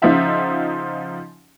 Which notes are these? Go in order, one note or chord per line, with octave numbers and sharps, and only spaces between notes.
C#3 F3 D#4 F4 E5 F#5